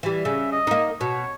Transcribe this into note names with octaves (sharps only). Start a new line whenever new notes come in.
E3 G3
C#3 E5
D#5
A#3 D#4
B2 C#5